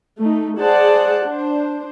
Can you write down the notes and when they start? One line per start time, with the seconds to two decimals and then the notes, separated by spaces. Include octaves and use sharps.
0.20 A3 D#4
0.59 G#4 C5 D5 F#5 A5
1.25 D4 C5